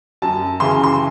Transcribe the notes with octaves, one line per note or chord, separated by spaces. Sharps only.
F#2 A5
C#3 E3 C6
C6